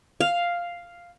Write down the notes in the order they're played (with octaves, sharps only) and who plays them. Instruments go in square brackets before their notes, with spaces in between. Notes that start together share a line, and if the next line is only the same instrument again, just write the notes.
[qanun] F5